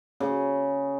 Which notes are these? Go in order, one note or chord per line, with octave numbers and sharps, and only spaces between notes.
C#3